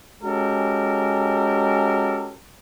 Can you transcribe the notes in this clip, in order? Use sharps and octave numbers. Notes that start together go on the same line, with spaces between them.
G#3 C#4 F#4 G4 A4 A#4